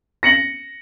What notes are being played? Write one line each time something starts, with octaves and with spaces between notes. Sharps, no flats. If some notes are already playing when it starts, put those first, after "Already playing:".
A#6 C#7 F#7